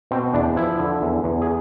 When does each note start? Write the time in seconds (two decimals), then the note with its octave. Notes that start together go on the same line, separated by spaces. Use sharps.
0.11 B2 C4
0.33 E2 D4
0.56 F3 E4
0.79 D3
1.02 E2
1.24 E2
1.42 G#4